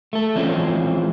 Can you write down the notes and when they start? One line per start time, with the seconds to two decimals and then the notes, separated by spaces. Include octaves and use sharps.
0.13 A3 A4
0.35 E3 F3 G#3 C4 C#4